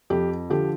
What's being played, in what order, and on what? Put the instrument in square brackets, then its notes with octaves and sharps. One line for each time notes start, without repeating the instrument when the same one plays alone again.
[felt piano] F2 G4
D3 F3 G4